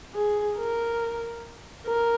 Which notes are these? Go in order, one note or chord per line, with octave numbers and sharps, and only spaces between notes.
G#4
A#4
A#4